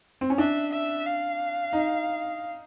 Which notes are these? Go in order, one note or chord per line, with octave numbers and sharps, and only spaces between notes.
C4
C#4
D4 E5
E5
F5
D#4